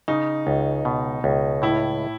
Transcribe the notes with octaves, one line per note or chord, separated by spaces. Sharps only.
C#3 D#4
C#2
B2
C#2
A2 E4